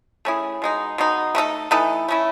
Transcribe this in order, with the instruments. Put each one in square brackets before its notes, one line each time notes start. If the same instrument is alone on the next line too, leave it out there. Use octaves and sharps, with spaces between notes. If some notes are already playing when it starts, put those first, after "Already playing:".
[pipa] A3 C#4 E4 G#4
B2 G#3 D#4
B2 G#3 D#4
E3 A3 D#4 A4
E3 A3 D#4 A4
A3 C#4 E4